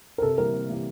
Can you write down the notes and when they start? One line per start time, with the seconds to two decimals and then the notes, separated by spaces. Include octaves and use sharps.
0.18 A#4
0.22 C3 A4
0.38 E3 G3 A#3 A#4
0.54 C3
0.69 E3 G3 A#3